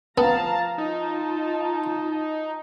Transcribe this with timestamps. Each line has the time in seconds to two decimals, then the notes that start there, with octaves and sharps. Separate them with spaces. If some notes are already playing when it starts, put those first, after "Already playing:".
0.18 F3 B3 F5 A5 A#5
0.78 D#4 F4 A5